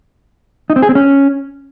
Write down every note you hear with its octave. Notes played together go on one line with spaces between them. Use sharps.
D#4
C4
G#4
C4
C#4